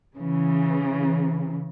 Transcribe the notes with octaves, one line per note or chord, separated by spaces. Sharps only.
C#3 E3